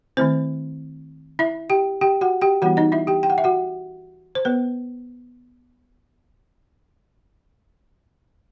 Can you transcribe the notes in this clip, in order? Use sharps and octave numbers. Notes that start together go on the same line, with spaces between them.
D#3 A3 C4 E4 C5
E4 E5
G4 G5
G4 G5
F#4 F#5
G4 G5
E3 G3 B3 E4 F#4 F#5
D#4 D#5
E4 E5
G4 G5
G5
F#5
E5
F#4 F#5
C5
B3 B4